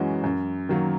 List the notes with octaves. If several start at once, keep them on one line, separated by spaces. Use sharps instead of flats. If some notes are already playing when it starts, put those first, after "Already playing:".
Already playing: F#2 E3 G#3 C#4 F#4
F#2
D#3 F#3 A#3